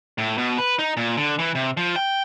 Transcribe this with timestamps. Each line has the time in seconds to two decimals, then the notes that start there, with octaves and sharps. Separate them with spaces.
0.18 A2
0.38 B2
0.58 B4
0.79 D#4
0.97 A#2
1.17 D3
1.39 E3
1.55 C3
1.77 F3
1.96 G5